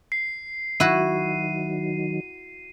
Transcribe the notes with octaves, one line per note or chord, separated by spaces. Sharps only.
C7
D#3 F#3 E4 F#4 D#7